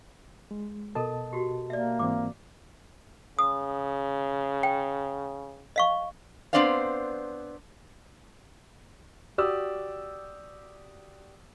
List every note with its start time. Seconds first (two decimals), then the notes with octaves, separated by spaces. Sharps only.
0.51 G#3
0.95 B2 A4 A#4 D#5 A5
1.33 F#4 G4
1.70 A#3 D5 E5
1.99 G#2 E3 C4 D6
3.39 C#3 D#6
4.63 G5
5.76 D#5 F5 C#6
6.53 B3 C4 D4 C5 D5 F5
9.38 F#4 G4 D5 D#6 E6